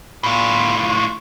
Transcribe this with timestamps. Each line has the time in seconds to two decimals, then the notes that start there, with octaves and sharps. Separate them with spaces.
0.23 A2 F4